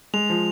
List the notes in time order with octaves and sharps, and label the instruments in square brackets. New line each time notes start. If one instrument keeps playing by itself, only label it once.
[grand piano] G#3 [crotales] F7
[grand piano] F3